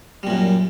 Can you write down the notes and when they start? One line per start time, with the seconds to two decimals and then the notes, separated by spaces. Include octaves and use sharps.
0.23 G3
0.27 A#2
0.30 F#2